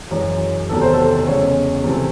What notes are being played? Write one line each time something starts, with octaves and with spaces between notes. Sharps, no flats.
F#2 E3 G#3 C#5
E2 C3 D#3 F#3 A3 A4
C5
A4
E2 C#3 G#3 C#4 C#5
C3 E3 A3 C4